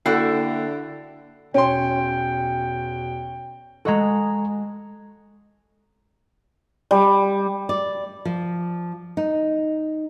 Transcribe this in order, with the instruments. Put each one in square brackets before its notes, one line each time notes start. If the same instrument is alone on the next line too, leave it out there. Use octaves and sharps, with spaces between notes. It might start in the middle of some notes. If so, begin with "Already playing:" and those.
[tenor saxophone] D3 [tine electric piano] A#3 G5 C7 [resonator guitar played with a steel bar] E4 F#4 A4
[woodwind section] E2 B2 G5 [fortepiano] C#4 C6
[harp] G#3 F#4 [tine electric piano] A4 D#5 A#5
[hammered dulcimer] G3
[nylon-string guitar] D5
F3
D#4